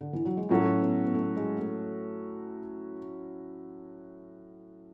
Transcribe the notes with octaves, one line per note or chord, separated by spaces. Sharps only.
D3
E3
F#3
G#3
A2 F#3 A3 C#4 F#4 A4
B3
B3
A3
G#3
A3